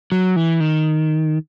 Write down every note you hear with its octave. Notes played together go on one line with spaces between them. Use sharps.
F#3
E3
D#3